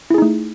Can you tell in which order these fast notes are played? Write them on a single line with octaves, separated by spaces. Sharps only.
E4 G#4 D#4 A3